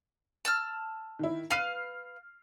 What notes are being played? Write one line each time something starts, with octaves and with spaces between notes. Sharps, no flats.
A5 E6 F6
D#3 E4
B4 F5 F6 C7 F7